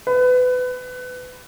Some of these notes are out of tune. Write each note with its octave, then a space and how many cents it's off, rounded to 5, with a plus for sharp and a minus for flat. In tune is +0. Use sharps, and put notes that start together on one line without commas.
B4 +25